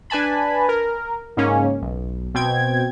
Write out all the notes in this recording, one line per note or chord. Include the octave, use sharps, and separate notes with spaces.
D4 B4 G#5 A5 B5
A#4
G#2 C#3 A#3 C#4
B1
B2 C4 G5 G#6